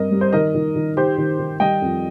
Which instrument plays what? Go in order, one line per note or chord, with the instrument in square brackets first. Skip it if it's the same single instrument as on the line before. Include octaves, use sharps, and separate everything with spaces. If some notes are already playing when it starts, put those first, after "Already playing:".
Already playing: [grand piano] G2 C4 [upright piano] A#4 D#5
[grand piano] G3
[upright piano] C5
[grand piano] D#3 [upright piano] A#4 D#5
[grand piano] D#3
D#3
[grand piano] D#3 [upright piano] G4 C5
[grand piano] D#3
D#3
[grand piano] G3 [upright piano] D#5 G5
[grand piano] F2